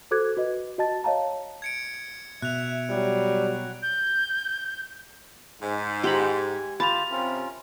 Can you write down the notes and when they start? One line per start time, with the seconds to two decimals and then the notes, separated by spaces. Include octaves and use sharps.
0.11 F#4 A4 C5 D6 F#6 G#6
0.37 F#4 B4 D#5
0.78 F#4 D#5 A5 A6
1.04 C#5 D#5 F5 A5 A#5
1.62 G#6 C#7 D7
2.42 B2 E5 F#6 F7
2.90 F#3 G3
3.83 G6
5.61 G#2
6.04 G4 C5 F#5 A#5 B5
6.37 G#5
6.80 F4 G4 A5 B5 F7
7.11 C3 C#4 F4 A#4